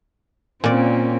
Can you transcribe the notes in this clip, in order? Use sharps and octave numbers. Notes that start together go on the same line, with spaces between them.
A#2 A#3 C4 C#4 F4 D5